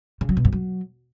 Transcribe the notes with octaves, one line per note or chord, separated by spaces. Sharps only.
C#3
F#3
B2
G2
F#3